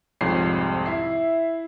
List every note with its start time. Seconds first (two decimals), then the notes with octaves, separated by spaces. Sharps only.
0.21 C2 F2 G#2 C#5 C7
0.86 E4 E5 C7